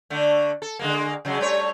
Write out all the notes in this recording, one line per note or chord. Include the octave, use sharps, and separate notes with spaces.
D3 A3
A4
D3 G#3 A#3
C#3 F#3 G#3
G3 A3 C#5